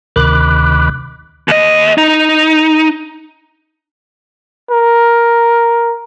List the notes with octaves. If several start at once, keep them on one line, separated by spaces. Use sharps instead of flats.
D2 C3 D#3 B5 D6 F#6
D#2 D#5
D#4
A#4